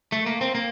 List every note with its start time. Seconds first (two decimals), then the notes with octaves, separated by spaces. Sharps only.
0.12 A3
0.26 A#3
0.41 C4
0.55 A#3